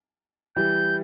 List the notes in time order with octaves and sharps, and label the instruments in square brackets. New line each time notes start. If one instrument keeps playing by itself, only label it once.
[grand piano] E3 G3 [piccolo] G6